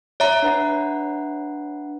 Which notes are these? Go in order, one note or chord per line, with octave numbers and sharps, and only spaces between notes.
C#5 E5 A#5
D4 B4 F#5